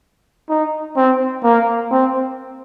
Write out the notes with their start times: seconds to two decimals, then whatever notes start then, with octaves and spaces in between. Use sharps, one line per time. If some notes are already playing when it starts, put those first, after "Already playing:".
0.49 D#4
0.97 C4
1.44 A#3
1.91 C4